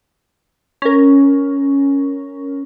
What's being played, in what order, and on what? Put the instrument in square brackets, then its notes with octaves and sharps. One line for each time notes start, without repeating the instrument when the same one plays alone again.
[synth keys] C#4 A#4